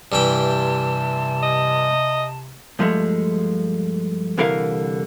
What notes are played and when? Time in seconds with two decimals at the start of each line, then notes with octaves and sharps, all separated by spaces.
0.12 G2 C3 E3 G5 A5
1.43 D#5
2.79 G2 F3 G#3 A3
4.37 C2 D3 E3 A#4 D5 F5